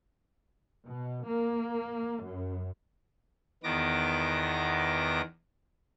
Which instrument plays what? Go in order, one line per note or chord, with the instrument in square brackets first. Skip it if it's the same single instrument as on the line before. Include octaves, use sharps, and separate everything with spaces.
[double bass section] B2
A#3
F#2
[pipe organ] E2 D#3 B3 D6 A#6